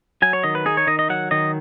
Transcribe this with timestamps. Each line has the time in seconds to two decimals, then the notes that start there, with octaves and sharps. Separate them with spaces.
0.22 F#3 G#5
0.33 C#5
0.43 D#3 D#5
0.55 B4
0.66 D#4 G#4
0.77 C#5
0.87 D#3 D#5
0.99 D#5
1.09 F#3 F#5
1.31 D#3 D#5